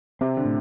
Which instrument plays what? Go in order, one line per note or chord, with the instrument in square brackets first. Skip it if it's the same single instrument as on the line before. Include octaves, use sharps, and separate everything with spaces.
[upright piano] C3 [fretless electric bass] C4
[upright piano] D3
[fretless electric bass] A2